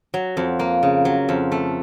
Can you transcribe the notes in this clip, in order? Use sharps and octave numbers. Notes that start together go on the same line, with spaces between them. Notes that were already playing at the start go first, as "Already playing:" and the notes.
F#3
F2
A#3
C#3
F#3
F2
A3